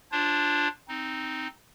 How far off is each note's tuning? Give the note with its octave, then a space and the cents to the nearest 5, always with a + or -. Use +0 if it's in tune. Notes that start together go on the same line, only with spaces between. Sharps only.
D4 +0 F4 +0 C5 +40
C4 +0 D#4 +0